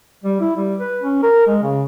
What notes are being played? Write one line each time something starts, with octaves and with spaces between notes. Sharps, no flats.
G3
E4
G3
B4
C#4
A#4
G#3
C#3